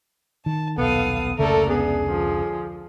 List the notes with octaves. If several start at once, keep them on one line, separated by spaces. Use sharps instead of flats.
D#3 A5
D#1 B1 B3 A4 F5 D#6
F1 C#2 C#3 A3 A4 A#4 D5
B3 D4 G#4
D3 F3